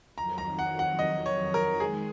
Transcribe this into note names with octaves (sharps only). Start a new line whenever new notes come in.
F2 D#3 F#3 A#5
A#5
F#5
F#5
D#5
C#5
A#4
D#3 G#3 G#4